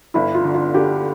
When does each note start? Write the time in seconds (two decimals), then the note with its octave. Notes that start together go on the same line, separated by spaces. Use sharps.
0.14 G1 E4
0.34 F4
0.44 D3
0.54 F4
0.74 D3 G4